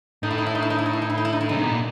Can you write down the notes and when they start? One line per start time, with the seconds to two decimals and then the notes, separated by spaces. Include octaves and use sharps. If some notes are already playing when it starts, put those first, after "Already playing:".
0.23 A2 D#4
0.31 E4
0.38 D#4
0.46 E4
0.55 D#4
0.62 E4
0.70 D#4
0.78 E4
0.86 D#4
0.93 E4
1.02 D#4
1.10 E4
1.18 D#4
1.25 E4
1.33 D#4
1.41 E4
1.49 C#3 D#4
1.58 C3
1.65 B2
1.71 A#2